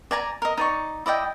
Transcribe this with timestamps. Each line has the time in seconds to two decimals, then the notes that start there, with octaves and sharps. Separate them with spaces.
0.11 D5 G#5 A#5
0.42 A#4 D#5
0.57 D#4 D5 C#6
1.06 E4 D5 D#5 G5